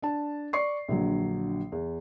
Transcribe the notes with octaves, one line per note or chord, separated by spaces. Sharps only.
D4 A5
D5 C#6 C7
A#1 D3 F#3
E2